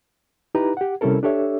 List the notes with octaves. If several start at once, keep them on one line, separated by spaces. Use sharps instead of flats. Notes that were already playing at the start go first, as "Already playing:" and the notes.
D#4 E4 G4 B4 A#5
G4 F#5
C3 G3 C#4 E4 A4 A#4
D4 G4 A4 C#5 E5